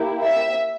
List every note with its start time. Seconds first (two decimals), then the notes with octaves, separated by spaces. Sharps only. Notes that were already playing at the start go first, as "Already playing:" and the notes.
Already playing: A#3 E4 G4
0.23 E5